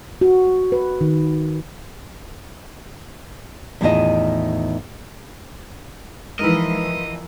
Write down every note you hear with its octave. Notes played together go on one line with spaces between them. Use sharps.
F#4
B4
D#3
E2 A2 D#3 E4 F4 D#5
E3 F3 G#3 D#4 E4 A#4 B4 D#5